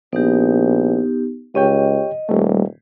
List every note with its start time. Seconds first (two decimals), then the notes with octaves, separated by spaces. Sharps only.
0.13 A#1 B3 D#4 G4
1.55 C#2 G4 C#5 D#5 G5
2.29 D#1 G3 A3